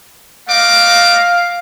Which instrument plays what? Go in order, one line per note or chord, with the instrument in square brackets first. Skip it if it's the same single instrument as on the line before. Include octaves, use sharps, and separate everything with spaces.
[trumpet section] A3 D#5 D6 [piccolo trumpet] F5